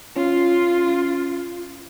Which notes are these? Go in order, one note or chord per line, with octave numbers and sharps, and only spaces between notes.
C#4 F4